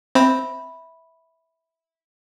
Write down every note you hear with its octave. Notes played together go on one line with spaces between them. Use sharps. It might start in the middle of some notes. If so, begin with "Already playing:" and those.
C4 E5 B5